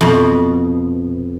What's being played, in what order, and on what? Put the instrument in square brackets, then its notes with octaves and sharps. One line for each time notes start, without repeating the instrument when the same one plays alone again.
[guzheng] F2 B2